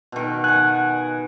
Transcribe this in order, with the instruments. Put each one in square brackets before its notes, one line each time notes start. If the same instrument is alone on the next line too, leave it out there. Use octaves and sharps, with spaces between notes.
[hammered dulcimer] B2 D#3
[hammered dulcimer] F#5 G#5 [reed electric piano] F#6